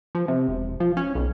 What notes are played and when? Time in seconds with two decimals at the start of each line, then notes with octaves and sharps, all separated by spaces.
0.15 F3
0.28 C3
0.48 E1
0.80 F3
0.97 C#4
1.15 B1